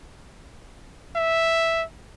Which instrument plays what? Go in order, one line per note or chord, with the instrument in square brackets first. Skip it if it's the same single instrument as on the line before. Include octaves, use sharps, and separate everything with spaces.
[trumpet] E5